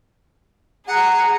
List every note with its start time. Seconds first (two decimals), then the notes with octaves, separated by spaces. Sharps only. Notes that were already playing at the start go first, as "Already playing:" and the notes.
0.88 G#4 F#5 A#5